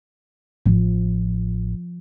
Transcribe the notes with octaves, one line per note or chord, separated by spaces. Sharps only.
A1 F3